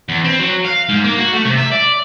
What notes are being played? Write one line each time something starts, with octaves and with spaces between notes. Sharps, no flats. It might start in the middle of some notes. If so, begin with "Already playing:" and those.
E2
C4
F#3
F5
G#2
A#3
F#4
A3
C3
E5
D5